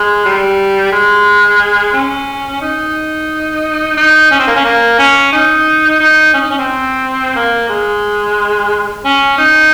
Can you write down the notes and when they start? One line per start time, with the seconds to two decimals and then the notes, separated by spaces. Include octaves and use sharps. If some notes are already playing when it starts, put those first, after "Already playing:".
Already playing: G#3
0.25 G3
0.92 G#3
1.93 C#4
2.62 D#4
3.97 D#4
4.31 C#4
4.39 C4
4.48 A#3
4.56 C#4
4.65 A#3
4.99 C#4
5.33 D#4
6.00 D#4
6.34 C#4
6.42 D#4
6.50 C#4
6.59 C4
7.36 A#3
7.69 G#3
9.05 C#4
9.38 D#4